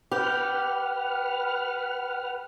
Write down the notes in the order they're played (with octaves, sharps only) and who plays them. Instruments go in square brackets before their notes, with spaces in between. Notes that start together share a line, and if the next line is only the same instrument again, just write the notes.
[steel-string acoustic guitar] G4 [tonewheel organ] B4 F#5 F6